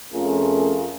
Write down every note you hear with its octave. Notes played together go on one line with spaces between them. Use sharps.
F2 A3 C#4 F4 G#4 A#4